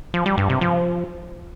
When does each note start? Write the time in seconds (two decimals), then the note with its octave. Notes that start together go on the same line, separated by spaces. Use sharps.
0.14 F3
0.26 G3
0.38 G2
0.49 C3
0.61 F3